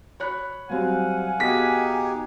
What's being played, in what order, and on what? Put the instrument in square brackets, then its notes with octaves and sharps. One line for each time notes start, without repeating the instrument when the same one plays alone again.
[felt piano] C#5 B5 F#6
[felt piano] F#3 G3 C4 [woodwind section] F5 F#5 G#5
[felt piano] B2 [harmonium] D#4 G4 G#4 [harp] B6